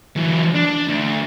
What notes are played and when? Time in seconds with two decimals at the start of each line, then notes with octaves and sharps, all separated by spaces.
0.16 E3 F#3
0.54 D4
0.88 D2